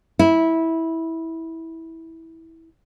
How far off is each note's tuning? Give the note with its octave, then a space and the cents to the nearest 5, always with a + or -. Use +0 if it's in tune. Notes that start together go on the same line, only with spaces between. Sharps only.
E4 -15